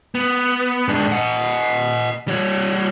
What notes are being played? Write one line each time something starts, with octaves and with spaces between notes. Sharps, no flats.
B3
G#2 D4
D#5 F#5
G3 C#5